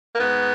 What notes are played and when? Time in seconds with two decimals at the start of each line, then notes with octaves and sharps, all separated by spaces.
0.14 A#3
0.20 G#2 B3